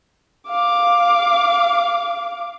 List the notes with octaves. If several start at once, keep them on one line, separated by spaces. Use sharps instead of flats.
F5 D6